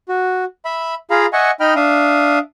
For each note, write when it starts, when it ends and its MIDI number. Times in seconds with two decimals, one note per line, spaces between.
0.09 0.44 66
0.65 0.95 76
0.65 0.95 83
1.11 1.26 65
1.11 1.26 68
1.11 1.26 77
1.11 1.26 82
1.11 1.26 83
1.33 1.51 75
1.33 1.51 76
1.33 1.51 78
1.33 1.51 80
1.33 1.51 85
1.60 1.74 63
1.60 1.74 75
1.60 1.74 79
1.60 1.74 83
1.60 1.74 89
1.76 2.39 62
1.76 2.39 76
1.76 2.39 77
1.76 2.39 87